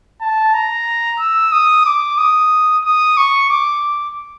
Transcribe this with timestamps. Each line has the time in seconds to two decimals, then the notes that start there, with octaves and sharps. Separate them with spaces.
0.21 A5
0.54 A#5
1.19 E6
1.52 D#6
1.86 D6
2.18 D#6
2.85 D#6
3.17 C#6
3.50 D6